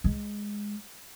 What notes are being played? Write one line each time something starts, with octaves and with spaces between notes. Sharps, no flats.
G#3